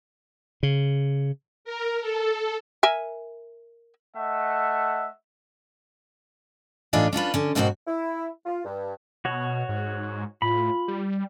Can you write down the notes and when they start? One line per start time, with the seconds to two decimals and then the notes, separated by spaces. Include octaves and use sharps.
0.63 C#3
1.65 A#4
2.01 A4
2.83 A#4 E5 G#5
4.17 A3 D#5 E5 F#5
6.93 A2 E3 D4 D#4 F4 G#4
7.13 C#4 D4 F4 B4
7.34 D3 C#4
7.55 G#2 B2 A#3 C4 E4 F#4
7.87 E4
8.45 F4
8.64 G2
9.25 B2 F#4 C#5
9.69 G#2
10.42 A2 F4 B5
10.88 G3